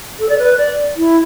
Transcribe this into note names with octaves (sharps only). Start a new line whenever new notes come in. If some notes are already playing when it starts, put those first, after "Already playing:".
A4
D5
B4
D5
E4